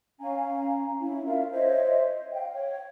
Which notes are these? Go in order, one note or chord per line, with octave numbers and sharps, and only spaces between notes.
C#4 F5 G#5 A#5
C#4 E4
F4 A#4 E5 F5
C5 C#5 D#5 E5
F5 G5
C#5